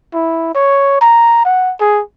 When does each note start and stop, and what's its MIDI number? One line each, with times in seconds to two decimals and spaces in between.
0.14 0.51 64
0.55 0.97 73
1.01 1.45 82
1.45 1.73 78
1.80 2.01 68